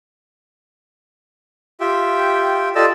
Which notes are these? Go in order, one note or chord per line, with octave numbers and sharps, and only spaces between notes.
F4 G4 E5 G5
F4 G4 A4 D5 D#5 E6